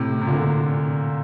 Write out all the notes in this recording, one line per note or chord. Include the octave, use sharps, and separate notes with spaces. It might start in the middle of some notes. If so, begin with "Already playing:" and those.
Already playing: A2 C3
C3
A#2 D3